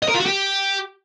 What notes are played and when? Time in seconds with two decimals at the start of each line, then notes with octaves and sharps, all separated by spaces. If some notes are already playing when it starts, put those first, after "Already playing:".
0.03 D#5
0.08 A#4
0.14 F4
0.20 F#4
0.26 G4